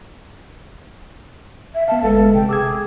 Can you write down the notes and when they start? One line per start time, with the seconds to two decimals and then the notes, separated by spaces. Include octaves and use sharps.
1.75 E5
1.88 B3 F5 A5
2.03 G1 G#3 A4 B4
2.35 C3 G5
2.49 G#4 D6 E6 G#6